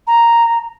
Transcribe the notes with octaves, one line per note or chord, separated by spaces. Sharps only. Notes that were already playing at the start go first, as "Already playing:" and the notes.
A#5